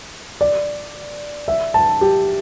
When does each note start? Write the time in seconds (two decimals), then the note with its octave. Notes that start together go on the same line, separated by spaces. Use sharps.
0.41 D5
1.48 E5
1.74 A5
2.01 G4